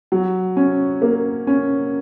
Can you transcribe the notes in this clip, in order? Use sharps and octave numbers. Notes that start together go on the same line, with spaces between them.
F#3
C#4
A#3
C#4